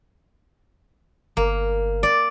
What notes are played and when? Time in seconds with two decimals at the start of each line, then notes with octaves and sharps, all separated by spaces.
1.37 G1 A#3
2.03 D5